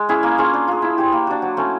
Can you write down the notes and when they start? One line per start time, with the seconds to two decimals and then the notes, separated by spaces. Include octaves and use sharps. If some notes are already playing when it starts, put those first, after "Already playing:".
Already playing: G#3
0.09 C#4 E4 G#4
0.23 A#3
0.38 C#4 F4 G#4
0.54 D4
0.68 F4 G#4
0.82 E4
0.98 G4 C5
1.12 A#3
1.27 D4 F#4
1.42 F#3
1.57 A3 C#4